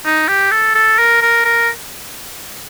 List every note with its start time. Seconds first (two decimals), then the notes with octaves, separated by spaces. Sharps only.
0.05 D#4
0.28 G4
0.51 A4
0.75 A4
0.99 A#4
1.22 A#4
1.45 A#4